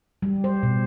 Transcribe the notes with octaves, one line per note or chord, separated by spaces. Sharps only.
G3
C5
B2